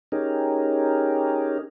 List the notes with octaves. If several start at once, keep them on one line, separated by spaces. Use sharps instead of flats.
C#4 D#4 G4 G#4 A#4